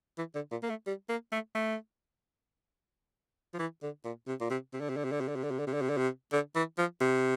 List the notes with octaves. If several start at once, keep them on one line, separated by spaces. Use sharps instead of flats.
E3
D3
A#2
A#3
A3
G3
A#3
A3
A3
F3
E3
D3
A#2
C3
A#2
C3
C3
D3
C3
D3
C3
D3
C3
D3
C3
D3
C3
D3
C3
D3
C3
D3
C3
D3
E3
F3
C3